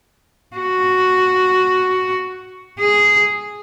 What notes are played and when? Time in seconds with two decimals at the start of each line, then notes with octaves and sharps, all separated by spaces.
0.56 F#4
2.80 G#4